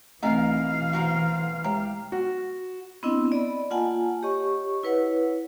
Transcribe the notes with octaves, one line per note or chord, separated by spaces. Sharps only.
B1 E3 A3 C4 D#4 E4 A#4 F5
F#4 A#4 C5
G#3 G4 C#5 A#5
F#4
B3 C4 D4 E4 D#5
D5 D#5 B5
A#3 F4 F#5 G#5 A5
G4 C#5 D#5 C#6
E4 B4 C#5 F#5